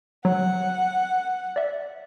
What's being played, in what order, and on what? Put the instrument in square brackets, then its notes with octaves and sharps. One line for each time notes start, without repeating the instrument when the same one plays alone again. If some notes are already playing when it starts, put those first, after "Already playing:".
[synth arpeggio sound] F#3 [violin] F#5
[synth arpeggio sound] D5 E5